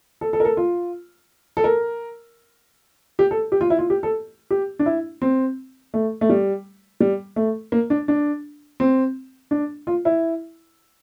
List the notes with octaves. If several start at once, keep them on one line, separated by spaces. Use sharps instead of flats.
A4
A4
A#4
A4
F4
A4
A#4
G4
A4
G4
F4
E4
F4
G4
A4
G4
D4
E4
C4
A3
A3
G3
G3
A3
A#3
D4
D4
C4
D4
F4
E4